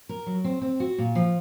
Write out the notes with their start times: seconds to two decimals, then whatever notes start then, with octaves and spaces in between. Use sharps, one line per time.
0.09 A#4
0.26 F#3
0.44 C4
0.62 C4
0.80 F#4
0.98 A#2
1.15 F3